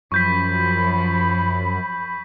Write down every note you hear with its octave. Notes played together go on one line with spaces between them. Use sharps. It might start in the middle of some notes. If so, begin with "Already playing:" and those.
F#2 F3 B5 C#6 G6 B6